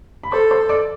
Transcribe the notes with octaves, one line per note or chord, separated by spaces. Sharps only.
B5
A4 C5 C6
C5 C6
D5 D6